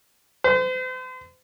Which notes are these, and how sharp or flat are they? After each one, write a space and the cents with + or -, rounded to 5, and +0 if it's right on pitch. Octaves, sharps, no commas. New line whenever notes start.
C5 -40